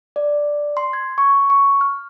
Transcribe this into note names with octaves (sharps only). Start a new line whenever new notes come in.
D5
C6
G#6
C#6
C#6
F6